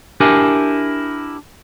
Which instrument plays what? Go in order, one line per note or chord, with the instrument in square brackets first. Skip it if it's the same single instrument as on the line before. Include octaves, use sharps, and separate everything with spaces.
[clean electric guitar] D4 E4 G4 A#4 G#5